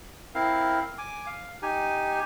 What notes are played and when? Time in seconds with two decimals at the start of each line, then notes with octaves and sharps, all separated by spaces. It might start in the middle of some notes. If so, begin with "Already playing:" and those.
0.35 C4 E4 A#4 F5
0.98 G#5 D6
1.26 F5
1.62 D#4 G4 G#5